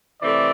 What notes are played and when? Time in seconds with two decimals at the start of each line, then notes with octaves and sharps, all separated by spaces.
0.20 C3 E3 A3 C4 D5